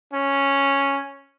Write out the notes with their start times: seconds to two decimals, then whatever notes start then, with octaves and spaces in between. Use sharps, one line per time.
0.14 C#4